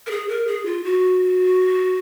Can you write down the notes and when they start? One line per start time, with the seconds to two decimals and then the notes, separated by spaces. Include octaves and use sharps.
0.07 A#4
0.11 G#4
0.29 A#4
0.47 G#4
0.66 F4
0.84 F#4